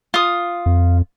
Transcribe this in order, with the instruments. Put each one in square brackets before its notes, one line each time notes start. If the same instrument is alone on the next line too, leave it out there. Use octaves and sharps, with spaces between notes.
[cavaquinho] F4 D#6
[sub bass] F2